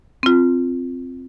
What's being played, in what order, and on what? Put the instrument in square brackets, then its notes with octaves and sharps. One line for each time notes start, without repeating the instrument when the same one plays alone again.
[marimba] C4 F4